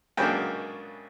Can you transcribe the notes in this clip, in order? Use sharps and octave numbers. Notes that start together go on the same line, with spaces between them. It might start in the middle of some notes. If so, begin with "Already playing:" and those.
C#2 C#3 F#3 A#3 D4 G5